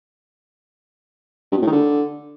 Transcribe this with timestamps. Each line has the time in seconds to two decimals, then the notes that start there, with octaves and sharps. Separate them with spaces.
1.52 G2
1.57 B2
1.62 A2
1.67 D#3
1.72 D3